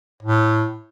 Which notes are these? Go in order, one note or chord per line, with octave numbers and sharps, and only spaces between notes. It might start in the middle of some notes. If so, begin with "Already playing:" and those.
A2